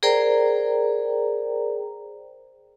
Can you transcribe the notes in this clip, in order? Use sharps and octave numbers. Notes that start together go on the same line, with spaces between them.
G#4 A#4 C5 D5 G5 A#5